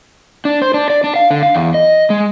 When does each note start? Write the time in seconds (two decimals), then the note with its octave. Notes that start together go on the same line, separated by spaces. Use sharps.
0.45 D4
0.62 C5
0.74 D4
0.90 D5
1.04 D4
1.16 F5
1.31 D3
1.43 F5
1.55 E2
1.74 D#5
2.10 G#3